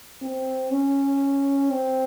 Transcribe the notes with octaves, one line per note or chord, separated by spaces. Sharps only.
C4
C#4
C4